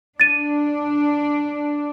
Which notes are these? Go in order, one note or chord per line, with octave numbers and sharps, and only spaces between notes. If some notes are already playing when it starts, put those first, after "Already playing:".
D4 A6 D#7